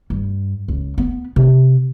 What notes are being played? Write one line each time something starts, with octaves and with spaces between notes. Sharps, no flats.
G2
C#2
B3
C3